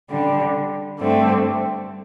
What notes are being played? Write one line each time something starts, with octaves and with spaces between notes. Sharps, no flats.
D3 G3 D4
G2 D3 A3 C4